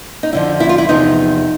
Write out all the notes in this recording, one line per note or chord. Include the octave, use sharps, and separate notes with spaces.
D#4
F2 D3 F3 E4
E4
F4
E4
E2 C3 F3 D#4